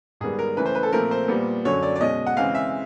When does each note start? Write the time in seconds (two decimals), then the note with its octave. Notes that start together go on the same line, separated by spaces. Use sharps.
0.21 G#2 D#3 G3 B3 G#4
0.39 A#4
0.57 C#3 E3 A3 B4
0.66 C5
0.75 B4
0.83 A4
0.93 A#2 F3 A3 C4 A#4
1.11 C5
1.28 A#2 G3 B3
1.65 F#2 D3 F#3 C#5
1.83 D5
1.96 D5
2.01 B2 G#3 C#4 D#5
2.26 F#5
2.37 C#3 E3 G#3 C4 F5
2.55 E5